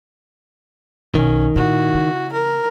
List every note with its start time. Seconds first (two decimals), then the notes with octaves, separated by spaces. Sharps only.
1.15 B1 D#3 C#4
1.56 A#2 E4 F#4
1.95 C#3
2.33 A#4